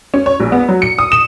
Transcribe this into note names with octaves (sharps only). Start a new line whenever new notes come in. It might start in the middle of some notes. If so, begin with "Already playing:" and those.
C#4
C#5
A#1
B3
F#3
C#7
D#6
E7